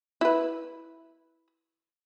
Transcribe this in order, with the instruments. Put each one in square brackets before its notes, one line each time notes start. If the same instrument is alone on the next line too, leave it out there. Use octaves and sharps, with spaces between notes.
[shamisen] E4 B4